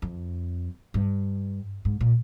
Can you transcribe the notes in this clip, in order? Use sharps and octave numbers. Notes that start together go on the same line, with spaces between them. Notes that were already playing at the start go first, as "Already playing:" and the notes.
F2
G2
G#2
A#2